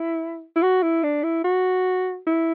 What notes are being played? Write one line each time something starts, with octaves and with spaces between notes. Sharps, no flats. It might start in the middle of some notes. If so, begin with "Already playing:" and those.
Already playing: E4
E4
F#4
E4
D4
E4
F#4
E4